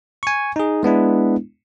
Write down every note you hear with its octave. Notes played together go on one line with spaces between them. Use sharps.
G#5 C#6
D#4 G#4
G#3 B3 D4 E4